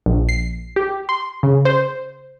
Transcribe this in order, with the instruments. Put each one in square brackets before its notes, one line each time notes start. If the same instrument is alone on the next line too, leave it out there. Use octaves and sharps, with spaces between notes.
[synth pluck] A#1
C7
G4
C6
C#3
C5